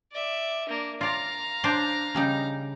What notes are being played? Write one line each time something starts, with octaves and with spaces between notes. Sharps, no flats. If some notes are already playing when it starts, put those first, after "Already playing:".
D5 E5
A#3 D4
F4 D5 F5 A#5
D4 C5 D5
C#3 G3 D#4